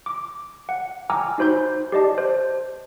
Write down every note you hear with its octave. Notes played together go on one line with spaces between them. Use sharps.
D6
F#5
G5 G#5 A#5 D6 E6 F6
D#4 F#4 C5 B5 G6
G4 D5 D#5 A5
C5